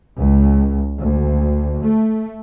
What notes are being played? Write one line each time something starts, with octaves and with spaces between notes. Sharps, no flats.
C#2
D2
A3